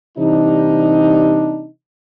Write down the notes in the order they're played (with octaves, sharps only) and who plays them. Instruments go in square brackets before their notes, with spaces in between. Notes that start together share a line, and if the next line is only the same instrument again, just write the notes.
[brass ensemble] C3 E3 G3 D4 D#4